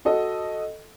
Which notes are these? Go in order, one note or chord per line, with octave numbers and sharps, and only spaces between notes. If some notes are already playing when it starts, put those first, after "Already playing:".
F#4 A4 D#5